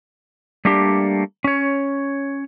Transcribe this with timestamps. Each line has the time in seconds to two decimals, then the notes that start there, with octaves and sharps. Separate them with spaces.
0.65 G3 A3 A#3 D4 G4
1.44 C#4 C#5